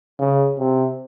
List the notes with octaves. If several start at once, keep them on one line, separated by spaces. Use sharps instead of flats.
C#3
C3